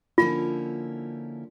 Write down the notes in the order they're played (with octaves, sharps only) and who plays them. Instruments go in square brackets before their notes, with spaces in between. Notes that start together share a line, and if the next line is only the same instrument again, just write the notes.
[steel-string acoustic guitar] D3 F3 A#3 C#4 E4 [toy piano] F4